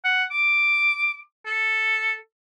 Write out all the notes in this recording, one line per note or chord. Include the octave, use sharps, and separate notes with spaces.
F#5
D6
A4